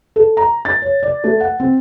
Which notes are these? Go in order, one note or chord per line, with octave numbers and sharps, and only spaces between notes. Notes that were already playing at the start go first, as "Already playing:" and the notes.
A4
A#5
A6
C#5
D5
A3
F#5
C4